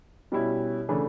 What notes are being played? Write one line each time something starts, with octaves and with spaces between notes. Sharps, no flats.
B2 G3 C#4 E4
C#3 E3 A3 D4